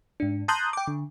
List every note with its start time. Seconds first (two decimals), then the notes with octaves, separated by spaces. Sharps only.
0.20 G#2 D4
0.48 A5 A#5 C6 D#6 F#6 G6
0.73 G5 D6
0.87 D3